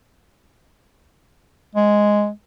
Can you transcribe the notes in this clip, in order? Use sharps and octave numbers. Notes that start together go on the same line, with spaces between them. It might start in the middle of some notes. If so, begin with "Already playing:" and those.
G#3